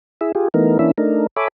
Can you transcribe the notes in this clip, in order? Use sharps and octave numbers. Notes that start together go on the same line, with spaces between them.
E4 G#4 E5
F4 G4 G#4
E3 A3 B3 D#4 A#4
E3 A#3 C#4 D4 E4 E5
A3 D4 D#4 A#4
A4 C#5 E5 G#5 B5 D6